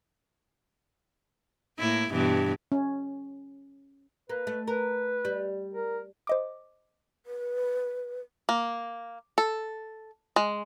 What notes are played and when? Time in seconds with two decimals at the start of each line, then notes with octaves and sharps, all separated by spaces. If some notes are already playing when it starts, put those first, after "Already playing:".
1.79 A2 A#3 E4
2.11 G2 B2 E3
2.72 C#4
4.29 A#3 B4
4.47 A3
4.68 A#4 B4
5.25 G3
5.73 A#4
6.27 C5 D#5 D6
7.26 B4
8.49 A#3
9.38 A4
10.36 G#3